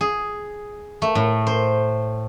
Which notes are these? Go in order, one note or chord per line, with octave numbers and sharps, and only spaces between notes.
G#4
A3
A2
C5